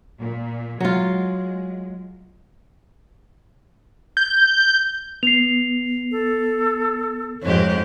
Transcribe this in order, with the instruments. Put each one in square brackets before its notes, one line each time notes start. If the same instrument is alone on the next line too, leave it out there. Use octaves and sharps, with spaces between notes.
[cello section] A#2
[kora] F#3 F4 [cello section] G#3
[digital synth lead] G6
[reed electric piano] B3 [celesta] C7 F7
[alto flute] A4
[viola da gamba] F2 G#2 G4 [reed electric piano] C#5